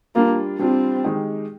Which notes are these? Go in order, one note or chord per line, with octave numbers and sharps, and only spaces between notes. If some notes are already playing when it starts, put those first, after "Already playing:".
G3 A#3 D4 F4
G3 C4 D4 F4
D#3 G#3 D#4 G4